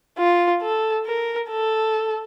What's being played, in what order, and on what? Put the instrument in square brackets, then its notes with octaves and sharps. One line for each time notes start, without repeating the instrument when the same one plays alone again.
[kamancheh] F4
A4
A#4
A4